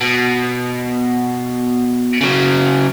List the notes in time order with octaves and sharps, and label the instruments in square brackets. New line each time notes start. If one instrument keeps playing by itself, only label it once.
[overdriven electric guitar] B2
C#3 F#3